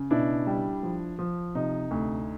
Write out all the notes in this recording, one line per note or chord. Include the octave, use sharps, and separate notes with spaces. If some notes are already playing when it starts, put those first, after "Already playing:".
Already playing: C#3
B2 D4 E4
G3
F3
F3
C3 D#4
D2